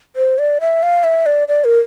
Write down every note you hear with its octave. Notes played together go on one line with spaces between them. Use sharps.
C5
D5
E5
F5
E5
D5
D5
A#4